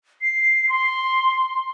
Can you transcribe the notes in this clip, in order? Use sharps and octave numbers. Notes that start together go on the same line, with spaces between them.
C7
C6